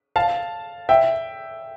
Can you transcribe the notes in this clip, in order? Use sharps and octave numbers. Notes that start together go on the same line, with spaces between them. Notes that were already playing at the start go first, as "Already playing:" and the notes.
F5 A5
E5 G5